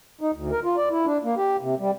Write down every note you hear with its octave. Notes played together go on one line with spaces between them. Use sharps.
D#4
D2
A#4
F4
D5
E4
D4
A#3
G4
C3
G3